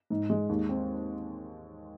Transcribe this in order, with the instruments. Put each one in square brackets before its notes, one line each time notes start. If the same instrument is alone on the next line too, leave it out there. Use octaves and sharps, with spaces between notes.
[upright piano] G#2
G#3
D#2
C4